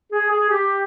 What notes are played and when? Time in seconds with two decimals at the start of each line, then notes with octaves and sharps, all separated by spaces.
0.12 G#4
0.29 G#4
0.49 G4